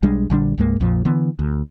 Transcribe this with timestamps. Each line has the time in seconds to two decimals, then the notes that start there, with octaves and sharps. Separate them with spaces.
0.02 B1 G3 G#3 D4
0.30 A#1 D3 G3 D4
0.58 C2 G2 G#3 A#3
0.80 A#1 F2 A#2 F3
1.05 D3 E3 B3
1.39 D2